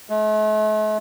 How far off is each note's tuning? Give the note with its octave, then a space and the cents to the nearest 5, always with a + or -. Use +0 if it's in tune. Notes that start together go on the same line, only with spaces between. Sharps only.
A3 -45